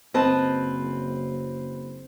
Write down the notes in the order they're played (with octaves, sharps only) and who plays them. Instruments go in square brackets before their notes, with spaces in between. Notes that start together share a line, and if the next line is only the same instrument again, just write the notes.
[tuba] F#1 [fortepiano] C4 [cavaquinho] B4 D#5 A5